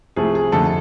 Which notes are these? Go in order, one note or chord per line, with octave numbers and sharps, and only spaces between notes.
C2 C3 F3 A3 G#4
G#4
F2 D3 A3 A4